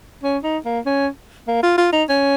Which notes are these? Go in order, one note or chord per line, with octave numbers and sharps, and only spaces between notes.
C#4
D#4
A#3
C#4
A#3
F4
F4
D#4
C#4